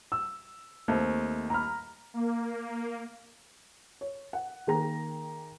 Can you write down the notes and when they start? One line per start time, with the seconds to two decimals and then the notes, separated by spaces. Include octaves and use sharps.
0.12 E6
0.88 D#2 A3 C4
1.50 A#5 B5 F6
2.14 A#3
4.01 C#5
4.33 F#5
4.67 D#3 A#3 G#4 G5 A#5 A#6